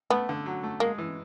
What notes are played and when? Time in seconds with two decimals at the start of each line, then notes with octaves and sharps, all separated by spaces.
0.10 A3 B3
0.29 D3
0.46 F#3
0.63 A3
0.80 G#3 A#3
0.98 E3